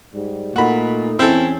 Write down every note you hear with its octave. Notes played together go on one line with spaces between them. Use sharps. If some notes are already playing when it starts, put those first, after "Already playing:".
G#2 G3
A#2 A3 D#4 F#4 B5
E2 C4 C#4 E4 A4